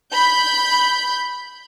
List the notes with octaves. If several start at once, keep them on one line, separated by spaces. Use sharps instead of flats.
B5 G6